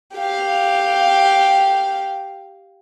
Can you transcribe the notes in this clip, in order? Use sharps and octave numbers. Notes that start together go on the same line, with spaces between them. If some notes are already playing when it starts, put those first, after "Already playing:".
G4 F5